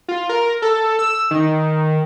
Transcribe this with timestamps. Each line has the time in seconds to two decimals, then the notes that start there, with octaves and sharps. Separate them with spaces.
0.08 F4
0.29 A#4
0.62 A4
0.99 E6
1.31 D#3